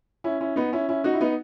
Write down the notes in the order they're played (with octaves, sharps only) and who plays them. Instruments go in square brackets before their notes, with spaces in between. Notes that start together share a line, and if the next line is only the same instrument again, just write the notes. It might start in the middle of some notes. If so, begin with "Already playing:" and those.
[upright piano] C#4 E4
C#4 E4
B3 D#4
C#4 E4
C#4 E4
D#4 F#4
E4
B3 D#4